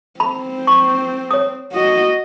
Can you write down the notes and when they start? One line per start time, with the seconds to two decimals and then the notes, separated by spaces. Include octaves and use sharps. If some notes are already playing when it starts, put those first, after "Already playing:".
0.20 C4 B5
0.67 C#6
1.31 C#5 D#6
1.72 F#4 D#5